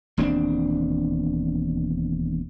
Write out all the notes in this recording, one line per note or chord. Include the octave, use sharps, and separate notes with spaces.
E1 D#2 C4 D4